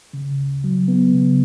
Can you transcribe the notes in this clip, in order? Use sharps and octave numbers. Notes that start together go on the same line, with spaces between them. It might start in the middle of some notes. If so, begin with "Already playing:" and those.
C#3
D2
F#3
B3
C#3